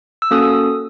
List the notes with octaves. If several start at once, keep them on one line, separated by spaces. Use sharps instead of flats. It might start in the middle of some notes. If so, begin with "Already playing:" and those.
E6
A#3 C#4 F#4 A4 D#6